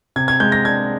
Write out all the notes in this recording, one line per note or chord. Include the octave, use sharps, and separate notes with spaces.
C3 G#6
G#6
G#3 G6
A#6
D4 G#6